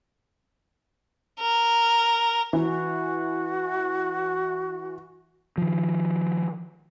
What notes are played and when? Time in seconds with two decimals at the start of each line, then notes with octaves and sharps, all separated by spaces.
1.39 A#4
2.53 E3 F#4
5.58 D#3 F3